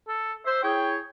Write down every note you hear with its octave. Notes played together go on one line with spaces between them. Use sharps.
A4
C5 E5
E4 G#4 C#5 G5